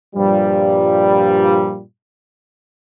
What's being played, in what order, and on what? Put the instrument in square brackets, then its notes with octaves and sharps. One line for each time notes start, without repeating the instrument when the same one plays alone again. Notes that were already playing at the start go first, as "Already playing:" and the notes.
[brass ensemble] G2 A#2 F3 G3